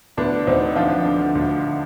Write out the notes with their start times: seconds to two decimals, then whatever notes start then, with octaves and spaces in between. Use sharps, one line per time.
0.17 D2 B3 D4
0.47 D2 C4 D#4
0.76 F3 D4 F4
1.05 D3
1.35 D2